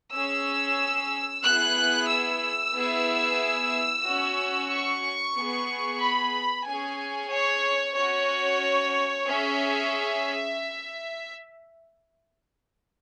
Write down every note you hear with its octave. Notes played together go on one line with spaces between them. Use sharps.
C#4 G#4 E6
B3 E4 G#4 F#6
E6
B3 E4 G#4
C#4 F#4
C#6
B3 G#4
B5
C#4 G#4 G#5
C#5
C#4 F#4 C#5
C#4 G#4 E5